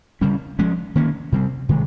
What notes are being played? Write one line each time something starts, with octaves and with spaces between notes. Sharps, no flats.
C#3 G3 C#4
F3 G#3 C#4
D#3 A#3 C#4
C3 G3 C4
C3 D#3 G#3